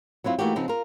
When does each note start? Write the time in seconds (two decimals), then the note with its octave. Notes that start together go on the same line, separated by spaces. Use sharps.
0.24 F#3 C4 E4 F4
0.39 E3 A3 A#3 D#4 F#4 G4
0.56 C#3 F3 B3 C4 D#4
0.68 F4 A#4